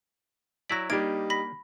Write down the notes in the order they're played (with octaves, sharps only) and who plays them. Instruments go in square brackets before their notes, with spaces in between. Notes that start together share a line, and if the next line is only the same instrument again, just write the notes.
[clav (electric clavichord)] F#3 E4 D5 [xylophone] A#6 B6
[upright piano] G3 D#4 [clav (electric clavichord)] A#3 D4 G4 [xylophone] G#6 D7
[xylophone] B5 A#6 B6